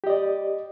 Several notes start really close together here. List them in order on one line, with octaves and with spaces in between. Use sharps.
G4 D#5 D5